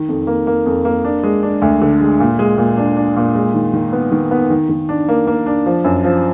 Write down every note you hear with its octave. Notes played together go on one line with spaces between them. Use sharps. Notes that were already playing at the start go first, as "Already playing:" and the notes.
Already playing: D#3
F2
A#3
A#3
F2
A#3
D4
G#3
D4
D2
D3
G#3
A#2
G#3
A#2
D4
D4
A#2
G#3
D#3
D#3
B3
D#3
B3
D#3
D#3
D4
A#3
A#3
D4
F3
F#2
F3